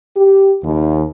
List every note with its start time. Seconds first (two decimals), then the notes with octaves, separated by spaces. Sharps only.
0.16 G4
0.63 D#2